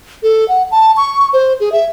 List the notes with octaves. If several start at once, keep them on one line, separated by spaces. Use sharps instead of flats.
A4
F#5
A5
C#6
C5
G#4
E5